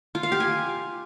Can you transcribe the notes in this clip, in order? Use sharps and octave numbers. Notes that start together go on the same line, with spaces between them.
F4
F5
G4
G#5